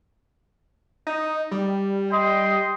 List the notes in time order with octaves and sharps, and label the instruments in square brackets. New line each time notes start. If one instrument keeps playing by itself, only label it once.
[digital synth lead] D#4
G3
[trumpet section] D#5 G5 C6